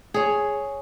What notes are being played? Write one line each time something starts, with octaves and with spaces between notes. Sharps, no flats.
G#4 C#5